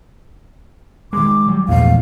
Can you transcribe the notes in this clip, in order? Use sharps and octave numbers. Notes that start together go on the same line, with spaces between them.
D#3 G#3 D6
F#3 G3
A#1 E2 G#2 A3 F5